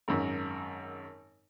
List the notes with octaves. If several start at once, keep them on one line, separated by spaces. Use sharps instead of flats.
G#1 F#2